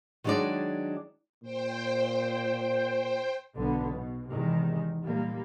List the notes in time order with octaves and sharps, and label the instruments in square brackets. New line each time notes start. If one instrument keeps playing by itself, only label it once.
[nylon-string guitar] D#3 F#3 G#3 D4 G#4 D5
[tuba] A#2 [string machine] C5 G5
[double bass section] B1 D3 B3
B2
E2 C3 D#3 G#3
A#2 G3 A#3